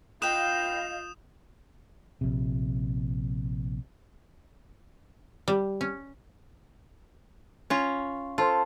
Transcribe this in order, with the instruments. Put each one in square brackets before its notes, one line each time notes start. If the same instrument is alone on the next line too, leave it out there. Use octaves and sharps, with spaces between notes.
[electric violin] F4 G6 [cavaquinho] B4 G5 [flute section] D#5 F5 [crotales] D#6 E7
[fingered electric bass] A#1 C3
[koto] G3
C#4
C#4 F4
[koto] F4 [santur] A4 C5